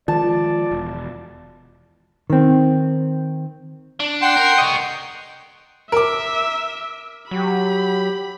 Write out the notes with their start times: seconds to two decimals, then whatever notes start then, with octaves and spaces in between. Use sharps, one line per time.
0.08 D#3 F3 G#3 F4 D5 A5
0.71 E1
2.30 D#3 C4
4.00 D4
4.22 F#5 G5 C6
4.37 A#4
4.59 C#5 D#5
5.92 A#4 E5 D6
7.31 F#3 G4 B5